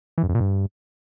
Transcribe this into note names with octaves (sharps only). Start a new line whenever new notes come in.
E3
F#2
F2
A#2
G2